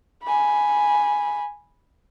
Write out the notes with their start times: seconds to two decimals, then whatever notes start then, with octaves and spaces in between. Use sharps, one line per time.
0.23 G#5 B5